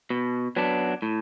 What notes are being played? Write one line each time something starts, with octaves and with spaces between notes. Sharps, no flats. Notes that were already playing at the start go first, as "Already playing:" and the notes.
B2
F#3 B3 D4
A2